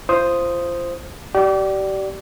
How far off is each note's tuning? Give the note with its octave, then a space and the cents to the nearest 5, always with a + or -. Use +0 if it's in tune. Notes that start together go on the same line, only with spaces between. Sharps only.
F4 -30 C5 +0 D#6 +0
G4 -35 D5 +0